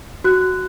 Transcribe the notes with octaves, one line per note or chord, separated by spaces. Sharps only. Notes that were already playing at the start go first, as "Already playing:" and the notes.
F#4 F#6